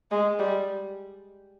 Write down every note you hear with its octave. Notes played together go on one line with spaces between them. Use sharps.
G#3
G3